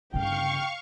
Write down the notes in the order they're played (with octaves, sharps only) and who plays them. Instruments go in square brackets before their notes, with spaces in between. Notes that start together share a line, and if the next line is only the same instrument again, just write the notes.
[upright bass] G1 C#3 [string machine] F5 C#6 [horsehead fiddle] G5